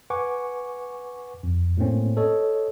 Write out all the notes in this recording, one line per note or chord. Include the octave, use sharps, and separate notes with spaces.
B4 F#5 G#5 C#6 D6
F2
A2 A3 A#3 C4 C#4
A4 C#5 D#5